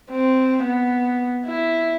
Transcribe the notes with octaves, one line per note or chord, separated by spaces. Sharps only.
C4
B3
E4